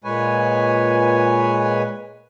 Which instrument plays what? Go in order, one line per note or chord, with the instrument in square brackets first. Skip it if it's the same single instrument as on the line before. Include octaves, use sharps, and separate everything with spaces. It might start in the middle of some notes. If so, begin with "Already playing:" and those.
[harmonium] A#2 G#3 B4 C#5 G#5